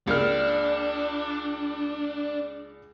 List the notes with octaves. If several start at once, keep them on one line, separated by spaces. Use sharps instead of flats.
C#2 A#3 D4 F6